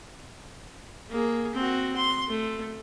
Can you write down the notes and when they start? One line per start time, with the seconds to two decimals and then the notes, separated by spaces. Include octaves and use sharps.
1.10 A#3 G#4
1.54 C4 F#4
1.96 C6
2.28 A3